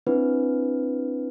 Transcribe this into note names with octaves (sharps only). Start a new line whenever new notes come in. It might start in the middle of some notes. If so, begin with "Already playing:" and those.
C4 D4 E4 B4